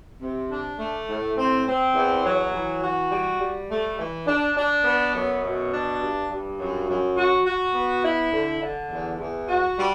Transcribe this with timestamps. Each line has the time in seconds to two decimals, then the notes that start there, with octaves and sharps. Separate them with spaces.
0.21 C3
0.50 D4
0.79 A3
1.09 A2
1.37 C4
1.67 C4
1.95 E2
2.25 F#3
2.53 E3
2.83 F#4
3.11 G3
3.40 G3
3.69 A3
3.98 E3
4.27 D4
4.56 D4
4.84 B3
5.14 F#2
5.43 B2
5.72 D4
6.00 G2
6.30 G2
6.59 F#2
6.88 F#2
7.17 F#4
7.46 F#4
7.74 B3
8.03 E4
8.32 D3
8.62 D3
8.90 E2
9.19 E2
9.48 F#4
9.78 G3